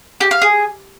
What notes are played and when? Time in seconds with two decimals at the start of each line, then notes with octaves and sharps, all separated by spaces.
0.20 G4
0.31 F5
0.42 G#4